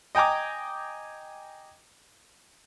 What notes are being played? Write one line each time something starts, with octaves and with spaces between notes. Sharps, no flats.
D#5 G5 G#5 A#5 D6